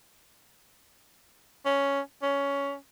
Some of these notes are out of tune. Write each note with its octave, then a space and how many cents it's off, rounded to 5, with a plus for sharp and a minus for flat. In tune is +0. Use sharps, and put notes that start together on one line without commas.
C#4 +5
C#4 +15